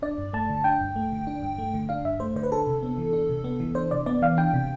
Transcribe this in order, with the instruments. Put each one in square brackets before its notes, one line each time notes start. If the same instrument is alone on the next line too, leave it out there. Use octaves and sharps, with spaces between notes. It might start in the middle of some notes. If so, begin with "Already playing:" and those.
[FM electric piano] D4 D5
G2
A3 A5
D3
D4 G5
G2
A3
D3
D4
G2
A3
D3
D4 F5
G2 E5
A3 C5
D3 C5
B4
D4 A4
C3
B3
E3
D4
C3
B3
E3
D4 C5
C3 D5
B3 D5
E3 F5
D4 G5
C3